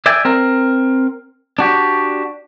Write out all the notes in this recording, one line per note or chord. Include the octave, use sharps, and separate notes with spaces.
D5 E5 G5 G#5
C4 A#4
D4 F#4 G4